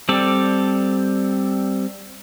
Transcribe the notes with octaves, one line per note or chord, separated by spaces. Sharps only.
G3 C4 A4 D5